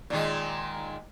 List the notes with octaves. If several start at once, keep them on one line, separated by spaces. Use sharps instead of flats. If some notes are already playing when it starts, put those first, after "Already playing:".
A#2 D#3 G#3